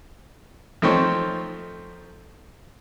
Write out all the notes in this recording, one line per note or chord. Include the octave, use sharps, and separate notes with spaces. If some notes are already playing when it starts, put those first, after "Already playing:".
F3 A3 C4 D#4 C5 C#5